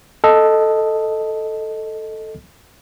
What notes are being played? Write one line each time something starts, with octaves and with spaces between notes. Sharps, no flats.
A4 D#5